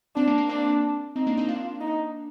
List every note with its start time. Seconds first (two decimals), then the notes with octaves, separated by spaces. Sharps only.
0.16 C4 D4
0.27 A#3
0.38 A#3
0.49 C4 D4
1.16 C4 D#4
1.27 A#3 D4
1.37 C4 D#4
1.48 A#3 D4 F4
1.81 D#4